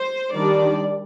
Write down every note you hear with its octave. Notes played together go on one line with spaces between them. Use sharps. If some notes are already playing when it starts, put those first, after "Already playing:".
Already playing: C5
D#3 G3 D4 D5